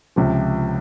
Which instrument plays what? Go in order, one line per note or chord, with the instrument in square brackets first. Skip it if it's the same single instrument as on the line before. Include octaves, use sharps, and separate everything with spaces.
[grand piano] C#2 C3 F3